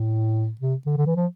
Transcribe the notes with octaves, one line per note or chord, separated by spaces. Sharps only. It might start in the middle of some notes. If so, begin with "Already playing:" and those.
Already playing: A2
C3
D3
D3
E3
F3